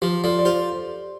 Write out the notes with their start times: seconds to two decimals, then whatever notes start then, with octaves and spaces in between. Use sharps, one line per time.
0.02 F3 G4 C5
0.24 F3 A4 D5
0.39 D5
0.45 F4 G4 C5